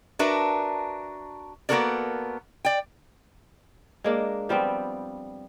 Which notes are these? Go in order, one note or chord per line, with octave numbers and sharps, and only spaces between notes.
D4 F#4 A#4 B4 E5
A#3 B3 F#4 A4 A#4 D5
D5 G5
G#3 A#3 D4
F3 G3 B3 C4